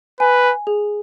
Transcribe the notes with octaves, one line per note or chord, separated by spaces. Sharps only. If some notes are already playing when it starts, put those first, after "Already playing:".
B4 G#5
G#5
G#4